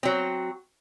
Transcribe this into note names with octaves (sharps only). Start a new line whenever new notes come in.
F#3 C4